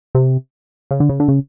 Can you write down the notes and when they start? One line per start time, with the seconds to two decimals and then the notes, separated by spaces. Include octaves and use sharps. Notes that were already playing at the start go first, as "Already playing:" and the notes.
0.15 C3
0.91 C#3
1.00 D3
1.09 C#3
1.20 D3
1.28 C#3